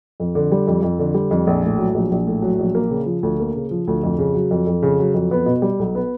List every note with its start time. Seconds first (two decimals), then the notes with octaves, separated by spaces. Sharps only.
0.20 F2
0.35 D3
0.52 G3
0.67 F2
0.83 F2
0.99 D3
1.14 G3
1.31 F2
1.47 A#1
1.63 A2
1.78 F#3
1.94 A#1
2.12 A#1
2.27 A2
2.42 F#3
2.59 A#1
2.75 A#3
2.90 C#3
3.06 F3
3.23 D2
3.39 A#3
3.55 C#3
3.71 F3
3.87 D2
4.03 F2
4.18 C#3
4.34 F#3
4.51 F2
4.67 F2
4.83 C#3
4.99 F#3
5.14 F2
5.31 B3
5.46 B2
5.62 G3
5.79 B1
5.95 B3